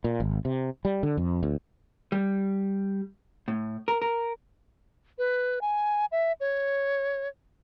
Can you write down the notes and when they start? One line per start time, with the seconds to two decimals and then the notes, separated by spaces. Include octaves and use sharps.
0.04 A#2
0.20 G#1
0.45 C3
0.85 G3
1.03 D3
1.17 F2
1.43 D2
2.12 G3
3.48 A2
3.88 A#4
4.02 A#4
5.18 B4
5.61 G#5
6.12 E5
6.40 C#5